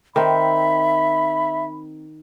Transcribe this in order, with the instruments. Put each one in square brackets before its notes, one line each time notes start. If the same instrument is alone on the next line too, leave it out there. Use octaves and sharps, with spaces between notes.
[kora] D#3 C4 [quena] E5 [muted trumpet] B5